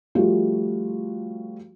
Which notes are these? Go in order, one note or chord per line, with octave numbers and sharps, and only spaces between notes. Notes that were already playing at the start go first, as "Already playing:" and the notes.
F3 G3 A3 F4 F#4